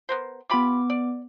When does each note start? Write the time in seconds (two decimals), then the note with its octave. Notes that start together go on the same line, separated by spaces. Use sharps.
0.09 B3 A#4 C5
0.50 B3 F4 G4 B5 D6
0.90 D5